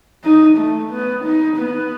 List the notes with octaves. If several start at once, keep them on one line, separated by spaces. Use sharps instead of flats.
D#4
A3
B3
D#4
B3